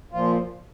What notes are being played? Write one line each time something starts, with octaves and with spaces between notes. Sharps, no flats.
A#2 F3 F4